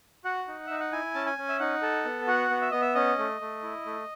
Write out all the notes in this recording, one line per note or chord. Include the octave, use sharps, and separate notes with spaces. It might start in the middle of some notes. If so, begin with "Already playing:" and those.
F#4 F#5
D#4
D#4 E5
F#5
E4 G#5
C#4 A5
G#5
C#4
E5
D#4 F#5
A4
B3
F#4 F#5
B3
E5
B3 D#5
E5
C#4 D#5
A3
A3
E4
A3